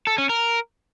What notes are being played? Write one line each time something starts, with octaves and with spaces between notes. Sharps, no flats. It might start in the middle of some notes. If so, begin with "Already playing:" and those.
A4
C#4
A#4